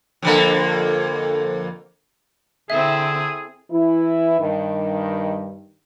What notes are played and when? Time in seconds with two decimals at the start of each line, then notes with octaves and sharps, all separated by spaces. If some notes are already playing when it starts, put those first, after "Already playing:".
0.22 F2 D3 A#3
2.70 D3 C4 E4 G#4 A4 E5
3.71 E3 E4
4.40 G2 D#3